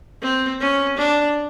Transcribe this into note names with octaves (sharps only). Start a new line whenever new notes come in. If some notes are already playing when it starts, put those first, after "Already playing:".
C4
C#4
D4